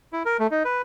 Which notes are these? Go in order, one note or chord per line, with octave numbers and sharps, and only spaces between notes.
E4
A#4
A3
D#4
B4